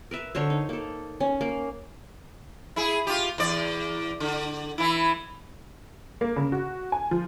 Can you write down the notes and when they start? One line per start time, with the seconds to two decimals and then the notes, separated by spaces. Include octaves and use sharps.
0.11 A#4 B4 E5
0.35 D3 A#4 C5 C#5
0.50 D#4
0.69 A#3 A4
1.20 C#4
1.41 A#3
2.76 E4 G#4
3.07 F4 G4
3.38 E2 D5
4.20 D3
4.78 E3 E4
6.21 A#3
6.36 C#3
6.52 F#4
6.92 G#5
7.11 F3